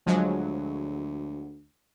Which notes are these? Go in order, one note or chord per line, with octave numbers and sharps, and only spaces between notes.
D2 F3 F#3 G#3